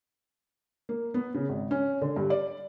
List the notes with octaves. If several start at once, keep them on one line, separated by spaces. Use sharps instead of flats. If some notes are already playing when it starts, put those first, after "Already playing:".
A#3
B3
C#3
G#1
C#4
D3
G2
D5